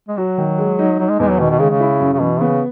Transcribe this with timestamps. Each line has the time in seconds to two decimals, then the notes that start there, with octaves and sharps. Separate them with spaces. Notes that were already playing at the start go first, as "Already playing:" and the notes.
0.08 G#3
0.18 F#3 F#4
0.38 D#3
0.58 G#3
0.79 D#4
0.99 F#3 D#4
1.09 G#3
1.19 E2 G#3
1.30 F#3
1.39 B2 D#3
1.50 B2
1.59 C#3 G#3
1.70 C#3
1.80 E4
2.00 F#2
2.13 C#3
2.20 B2 E3
2.41 C#3 B3